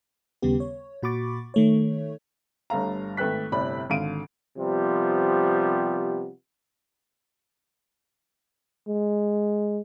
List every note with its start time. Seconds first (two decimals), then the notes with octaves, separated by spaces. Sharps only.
0.42 D#2 C#3 G3 B3 G4
0.60 C#5
1.03 A#2 F#4 B5 C#6 D6 A6
1.54 D#3 A3 C#5
2.70 G1 G2 A3 F5 A#5
3.17 G#1 A3 B4 G5 F#6 B6
3.52 G1 A2 C3 D5 B5
3.90 G#1 D3 F5 D7 D#7
4.58 C3 F3 G3 B3
8.88 G#3